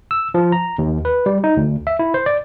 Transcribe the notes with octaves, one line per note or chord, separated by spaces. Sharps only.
E6
F3
A#5
D#2
B4
G3
D#4
D2
E5
E4
C5
D5